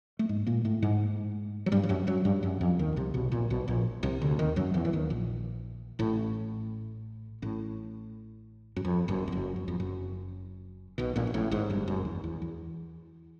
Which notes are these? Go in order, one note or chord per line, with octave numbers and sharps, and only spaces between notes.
A3
G#2 G#3
A#2 A#3
A2 A3
G#2 G#3
F#3
G2 G3
F3
F#2 F#3
F#2 F#3
G2 G3
F#2 F#3
F2 F3
D#2 D#3
C2 C3
B1 B2
A#1 A#2
B1 B2
A#1 A#2
C2 C3
D2 D3
D#2 D#3
F#2 F#3
E2 E3
E3
D#2 D#3
A#1 A#2
A1 A2
A1 A2
F#2
F2
F#1 F#2
F2
F#1 F#2
F#2
F2
F#1 F#2
B1 B2
A#1 A#2
A#2
A1 A2
G#1 G#2
G1 G2
F#1 F#2
E2
E2
E2